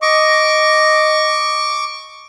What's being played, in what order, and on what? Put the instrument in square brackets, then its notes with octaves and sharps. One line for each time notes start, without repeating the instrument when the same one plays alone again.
[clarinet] D#5 [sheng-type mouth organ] C#6 D6